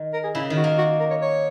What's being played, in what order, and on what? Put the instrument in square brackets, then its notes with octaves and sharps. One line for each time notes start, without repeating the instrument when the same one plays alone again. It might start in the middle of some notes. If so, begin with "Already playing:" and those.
Already playing: [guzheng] D#3
[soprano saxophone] A#4
G#4
[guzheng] C#3 [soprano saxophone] E4
[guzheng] D#3
[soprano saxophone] F#4
[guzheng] A#3
[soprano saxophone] F#4
A#4
C#5
C#5